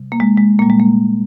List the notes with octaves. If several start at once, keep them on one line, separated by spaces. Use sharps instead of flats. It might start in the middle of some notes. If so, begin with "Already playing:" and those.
Already playing: C3 G3
A#3
G#3
G#3
A#2 G3 A#3
G#3
A#3